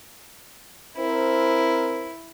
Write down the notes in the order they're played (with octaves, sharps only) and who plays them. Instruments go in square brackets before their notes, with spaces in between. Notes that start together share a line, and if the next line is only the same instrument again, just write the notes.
[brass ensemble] C4 A#4 C5 [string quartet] E4